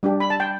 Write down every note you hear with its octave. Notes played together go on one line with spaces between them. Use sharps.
G3 D4 G4
B5
A5
G5